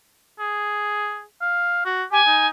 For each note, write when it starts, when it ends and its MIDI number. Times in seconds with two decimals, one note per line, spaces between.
0.39 1.22 68
1.41 1.85 77
1.85 2.04 66
2.12 2.21 67
2.12 2.47 80
2.27 2.50 63